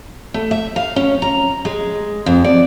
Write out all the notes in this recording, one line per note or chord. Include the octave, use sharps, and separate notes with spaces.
A3
E5
F5
C#4
A#5
G#3
F2
D5